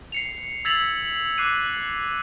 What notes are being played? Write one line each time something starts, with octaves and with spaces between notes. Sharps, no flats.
C7 C#7 F7
E6 G#6 A6 B6 F7 F#7
D6 F#6 C7 D#7